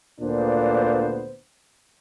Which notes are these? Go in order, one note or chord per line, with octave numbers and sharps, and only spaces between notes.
D2 A#2 B3 D4 C5